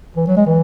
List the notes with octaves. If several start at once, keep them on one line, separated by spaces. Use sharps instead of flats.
E3
F#3
G#3
E3